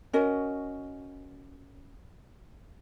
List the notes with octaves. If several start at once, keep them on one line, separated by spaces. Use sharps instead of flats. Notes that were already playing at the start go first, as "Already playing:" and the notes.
C#4 F#4 A#4 D#5